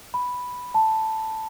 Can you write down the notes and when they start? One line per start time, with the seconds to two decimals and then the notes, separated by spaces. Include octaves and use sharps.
0.14 B5
0.74 A5